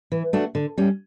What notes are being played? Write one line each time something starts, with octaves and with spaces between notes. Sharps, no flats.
E3
A3 D4 F#4
D3
G3 C#4